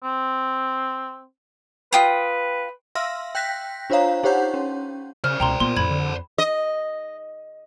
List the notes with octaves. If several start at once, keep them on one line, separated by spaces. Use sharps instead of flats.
C4
F4 B4 G5 D#6
E5 F5 C6 E6 F6 A#6
G5 F#6 G6 A#6 B6
D4 F4 C5 C#5 F5 A#5
D#4 G4 C5 C#5 F#5 G6
C#4
C#3 C5 D5 F6
C#2 B2 G5 A#5 C6
A#2 B3 C6
F2 A2 B5 G#6
D3
D#5